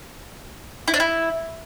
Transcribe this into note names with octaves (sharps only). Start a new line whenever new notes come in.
E4
D4
E4